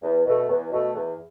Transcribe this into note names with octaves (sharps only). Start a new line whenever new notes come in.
E2
B2 A3
E2
B2 A3
E2